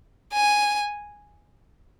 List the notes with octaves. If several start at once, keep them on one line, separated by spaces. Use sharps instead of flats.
G#5